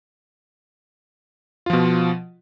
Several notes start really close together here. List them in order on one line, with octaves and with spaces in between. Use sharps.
F4 F3 B2